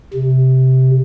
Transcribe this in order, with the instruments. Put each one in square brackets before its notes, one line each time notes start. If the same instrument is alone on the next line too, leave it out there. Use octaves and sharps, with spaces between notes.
[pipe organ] C3